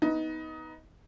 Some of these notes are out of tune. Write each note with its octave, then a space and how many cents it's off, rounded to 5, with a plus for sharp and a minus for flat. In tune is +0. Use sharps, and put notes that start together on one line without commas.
B3 +0 D#4 +20